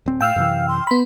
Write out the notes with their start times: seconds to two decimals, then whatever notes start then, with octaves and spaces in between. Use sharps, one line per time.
0.06 D1 C4
0.21 A2 F5 G5 E6 F6
0.36 F#2 C3 E3
0.68 C6
0.87 B3 B5 C6